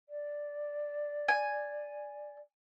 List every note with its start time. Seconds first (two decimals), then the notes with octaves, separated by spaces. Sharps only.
0.09 D5
1.28 G#5